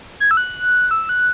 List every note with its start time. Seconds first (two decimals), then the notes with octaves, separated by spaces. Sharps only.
0.20 G#6
0.31 E6
0.37 F#6
0.91 E6
1.09 F#6